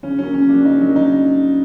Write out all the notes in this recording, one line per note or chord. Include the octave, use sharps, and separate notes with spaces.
C#3 C#4
F#3 A#3 C#4
C#3 C#4
F#3 A#3 D4
C#3 D#4
F#3
A#3
C#3 D#4